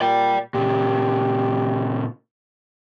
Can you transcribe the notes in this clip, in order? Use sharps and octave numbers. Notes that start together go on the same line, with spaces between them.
A#2 D5 G5
A#2 C#3 G4